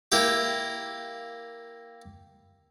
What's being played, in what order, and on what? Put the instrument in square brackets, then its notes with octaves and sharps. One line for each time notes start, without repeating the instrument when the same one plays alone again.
[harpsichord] A#3 E4 G4